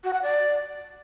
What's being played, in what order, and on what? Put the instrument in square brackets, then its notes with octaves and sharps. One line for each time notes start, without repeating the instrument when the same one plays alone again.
[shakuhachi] F#4
F#5
D5